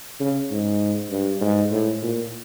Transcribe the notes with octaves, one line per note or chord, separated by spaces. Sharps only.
C#3
G#2
G2
G#2
A2
A#2